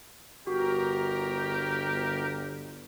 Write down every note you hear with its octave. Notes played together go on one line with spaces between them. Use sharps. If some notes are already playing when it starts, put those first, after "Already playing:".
G1 F#4 G4 A#4